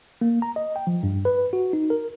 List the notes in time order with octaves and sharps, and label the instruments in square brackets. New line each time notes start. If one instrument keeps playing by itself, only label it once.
[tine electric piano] A#3
A#5
D#5
G5
F3
G2
B4
F#4
D#4
A#4